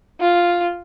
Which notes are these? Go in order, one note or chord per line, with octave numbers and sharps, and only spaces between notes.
F4